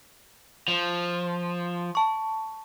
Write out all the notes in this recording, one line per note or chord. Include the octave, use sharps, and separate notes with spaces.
F3
A5 C#6